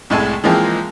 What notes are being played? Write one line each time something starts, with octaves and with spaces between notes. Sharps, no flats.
C2 A2 G#3 G#4 A4 G#5
E3 F3 G#3 A#3 C4